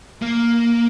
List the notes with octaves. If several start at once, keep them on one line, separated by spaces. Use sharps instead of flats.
A#3